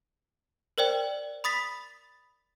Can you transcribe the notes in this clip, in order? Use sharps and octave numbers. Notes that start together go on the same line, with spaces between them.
A#4 C5 D5 G5
B5 D#6 A6 B6